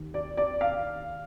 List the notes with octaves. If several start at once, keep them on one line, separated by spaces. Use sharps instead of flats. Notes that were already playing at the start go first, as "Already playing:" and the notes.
Already playing: D#2 D#3
D5
D5
F5